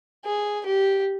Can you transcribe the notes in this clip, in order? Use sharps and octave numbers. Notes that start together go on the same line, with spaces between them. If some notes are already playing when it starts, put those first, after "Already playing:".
G#4
G4